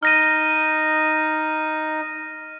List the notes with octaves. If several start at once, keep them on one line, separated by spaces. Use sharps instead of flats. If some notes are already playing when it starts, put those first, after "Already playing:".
D#4 F6 A#6 D#7